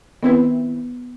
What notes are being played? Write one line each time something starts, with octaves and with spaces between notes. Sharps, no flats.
D#3 B3 C4 E4 B4